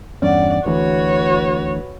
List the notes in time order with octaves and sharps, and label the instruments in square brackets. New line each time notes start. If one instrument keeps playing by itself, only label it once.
[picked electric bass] E2 G2 C#4 [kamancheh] D5 F#5
[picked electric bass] D2 E3 [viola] F#4 C#5 [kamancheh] B4